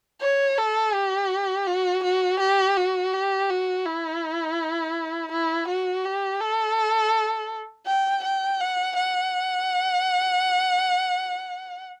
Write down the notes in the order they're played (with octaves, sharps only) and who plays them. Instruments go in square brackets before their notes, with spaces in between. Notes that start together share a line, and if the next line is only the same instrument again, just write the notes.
[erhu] C#5
A4
G4
F#4
F#4
G4
F#4
G4
F#4
E4
E4
F#4
G4
A4
G5
G5
F#5
F#5